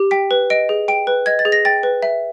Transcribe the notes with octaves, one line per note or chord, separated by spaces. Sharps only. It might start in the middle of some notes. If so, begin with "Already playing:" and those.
Already playing: G4
G5 B6
B4
D#5 D7
G#4
G5 D7
B4
D#5 G#6
A6
G#4
A#6
G5 A6
B4
E5